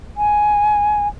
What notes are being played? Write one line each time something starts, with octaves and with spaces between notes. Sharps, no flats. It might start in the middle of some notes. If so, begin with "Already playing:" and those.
G#5